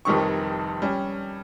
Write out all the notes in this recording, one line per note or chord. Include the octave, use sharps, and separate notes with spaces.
F1 F2 D#3 G3 C4 C#6
G3 C#4